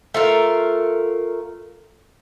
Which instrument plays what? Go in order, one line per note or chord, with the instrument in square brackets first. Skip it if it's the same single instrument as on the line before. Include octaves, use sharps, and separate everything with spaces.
[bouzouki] A3 F4 A#4